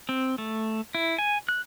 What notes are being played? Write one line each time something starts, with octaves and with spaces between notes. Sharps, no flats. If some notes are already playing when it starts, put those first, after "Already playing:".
C4
A3
E4
G#5
F#6